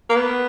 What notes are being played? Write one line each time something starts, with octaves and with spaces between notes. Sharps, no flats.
A#3
B3